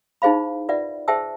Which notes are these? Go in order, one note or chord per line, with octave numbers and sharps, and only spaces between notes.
D#4 E4 G#4 C5 F5 B5
F4 B4 D5 E5 F#5
G#4 C5 E5 G5 A5 E6